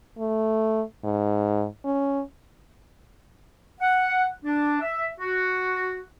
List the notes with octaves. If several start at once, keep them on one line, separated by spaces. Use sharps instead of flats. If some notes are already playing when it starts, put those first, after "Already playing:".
A3
G#2
C#4
F#5
D4
E5
F#4